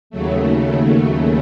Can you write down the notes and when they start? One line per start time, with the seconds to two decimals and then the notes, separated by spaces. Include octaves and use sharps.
0.10 D#2 C#3 F#3 A3